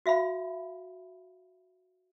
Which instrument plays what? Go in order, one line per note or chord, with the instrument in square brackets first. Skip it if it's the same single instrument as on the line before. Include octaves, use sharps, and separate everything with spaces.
[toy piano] F#4 E5 F5 B5